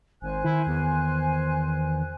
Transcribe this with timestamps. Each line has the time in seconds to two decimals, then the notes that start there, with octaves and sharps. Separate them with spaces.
0.22 G#1 C5 G#5 F#6
0.44 D#3 E4
0.67 E2